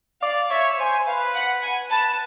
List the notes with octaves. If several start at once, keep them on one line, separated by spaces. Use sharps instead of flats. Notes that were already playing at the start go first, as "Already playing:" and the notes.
D5 F5
C#5 E5
C5 G#5
B4 F5
F#5
G#5
B4 A5